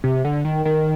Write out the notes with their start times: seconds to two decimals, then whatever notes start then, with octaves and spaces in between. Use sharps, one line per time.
0.04 C3
0.25 D3
0.45 D#3
0.65 D#3